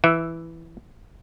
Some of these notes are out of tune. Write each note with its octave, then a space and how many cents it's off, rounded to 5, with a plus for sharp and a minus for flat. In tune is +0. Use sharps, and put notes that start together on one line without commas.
E3 +0 E5 +0